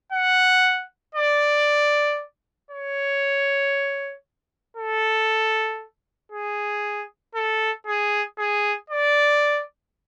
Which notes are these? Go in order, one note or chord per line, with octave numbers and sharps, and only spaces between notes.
F#5
D5
C#5
A4
G#4
A4
G#4
G#4
D5